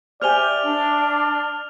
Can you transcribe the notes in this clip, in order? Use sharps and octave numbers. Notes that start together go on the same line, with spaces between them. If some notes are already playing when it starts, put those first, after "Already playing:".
G4 C5 D5 E5 G#5 F6 F7 G7
D4